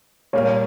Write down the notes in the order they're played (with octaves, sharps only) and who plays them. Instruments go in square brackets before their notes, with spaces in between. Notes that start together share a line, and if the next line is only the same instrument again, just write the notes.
[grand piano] A#2 G3 A#3 [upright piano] C#5